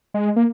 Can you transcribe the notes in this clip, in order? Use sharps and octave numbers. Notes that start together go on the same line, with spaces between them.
G#3
A#3